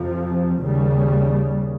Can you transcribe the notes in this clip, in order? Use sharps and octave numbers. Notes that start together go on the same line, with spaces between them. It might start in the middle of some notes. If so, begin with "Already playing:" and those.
Already playing: F2 C3 F3
D#2 C#3 G3